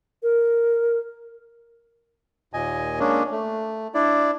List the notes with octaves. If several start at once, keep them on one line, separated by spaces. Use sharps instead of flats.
A#4
D#2 A#2 D#5 G#5
G#3 A#3 C#4 D4
A3
D4 E4 D5